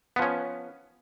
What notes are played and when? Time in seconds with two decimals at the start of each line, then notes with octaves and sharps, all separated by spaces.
0.16 B3
0.19 F3
0.22 C#4